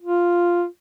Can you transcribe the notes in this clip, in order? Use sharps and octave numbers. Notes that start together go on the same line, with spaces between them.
F4